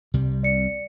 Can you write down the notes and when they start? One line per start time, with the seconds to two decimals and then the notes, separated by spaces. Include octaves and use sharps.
0.14 C2 C3 G3
0.43 D5 C#7